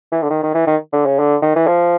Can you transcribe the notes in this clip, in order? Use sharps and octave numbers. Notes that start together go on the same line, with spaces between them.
E3
D3
D#3
D#3
E3
D#3
D3
C#3
D3
D#3
E3
F3